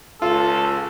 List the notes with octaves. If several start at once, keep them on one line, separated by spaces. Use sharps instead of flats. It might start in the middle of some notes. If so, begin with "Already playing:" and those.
C#2 F4 A4